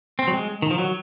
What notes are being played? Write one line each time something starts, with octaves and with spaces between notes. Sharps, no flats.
C4
F#3
G#3
D#3
F3
F#3